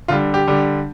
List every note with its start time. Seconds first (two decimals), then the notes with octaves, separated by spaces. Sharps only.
0.08 D3 G3 F4
0.34 G4
0.47 D3 G3